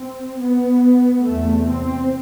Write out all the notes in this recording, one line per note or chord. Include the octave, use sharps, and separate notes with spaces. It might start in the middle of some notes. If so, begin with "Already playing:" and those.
Already playing: C4
B3
E2 C3 A3
C4